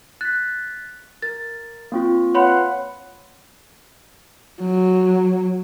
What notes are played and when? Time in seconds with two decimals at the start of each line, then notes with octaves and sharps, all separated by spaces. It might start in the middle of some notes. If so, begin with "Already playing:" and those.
0.21 F#6 A6 B6
1.22 A#4 A6
1.92 A#3 C4 F4
2.35 B4 C#5 F5 F#5 B5 C6
4.61 F#3